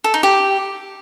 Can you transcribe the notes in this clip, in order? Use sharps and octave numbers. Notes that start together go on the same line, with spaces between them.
A4
D#4
G4